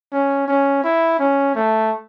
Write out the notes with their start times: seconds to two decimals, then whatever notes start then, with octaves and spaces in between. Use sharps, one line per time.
0.12 C#4
0.48 C#4
0.84 E4
1.19 C#4
1.55 A3